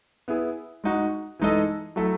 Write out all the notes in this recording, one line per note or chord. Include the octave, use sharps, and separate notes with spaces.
B3 E4 G#4
G#3 D#4 F#4
E3 G#3 D#4 A4 D#5
F#3 A3 E4 A4 E5